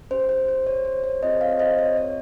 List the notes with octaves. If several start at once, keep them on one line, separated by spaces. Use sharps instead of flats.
C#4 G4 C5
C5
C5
C#5
C5
C#5
C4 F4 G#4 C5 D#5
C#5 F5
C5 D#5
C#5
C#5